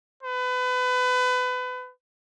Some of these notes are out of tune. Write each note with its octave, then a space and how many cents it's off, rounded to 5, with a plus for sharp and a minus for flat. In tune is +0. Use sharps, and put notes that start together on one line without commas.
B4 +30